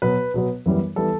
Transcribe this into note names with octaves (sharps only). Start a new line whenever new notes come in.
B2 F#3 B3 B4
B2 F#3 B3
F#2 E3 G3 B3
E3 G3 B3 A4